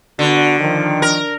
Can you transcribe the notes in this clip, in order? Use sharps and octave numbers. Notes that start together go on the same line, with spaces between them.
D3 B3 D4 F#4
D#3 F3
A#4